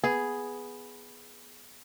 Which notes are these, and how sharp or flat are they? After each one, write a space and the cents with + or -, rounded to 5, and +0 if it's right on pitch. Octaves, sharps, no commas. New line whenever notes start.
B3 +0 G#4 +0